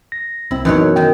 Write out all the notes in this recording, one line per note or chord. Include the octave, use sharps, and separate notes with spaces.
A#6
C2 C4 E4
F#2 B2 E3 D#4 C#5
D#3 A#4 G5